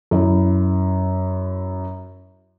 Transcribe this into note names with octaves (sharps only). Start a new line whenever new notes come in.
F#2 E4